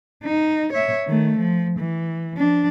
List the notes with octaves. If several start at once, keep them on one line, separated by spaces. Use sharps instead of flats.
D#4
C#5 E5
D#3 A3
F3
E3
F3 D4